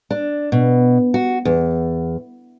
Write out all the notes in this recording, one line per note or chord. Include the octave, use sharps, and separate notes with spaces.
D4
B2
F#4
E2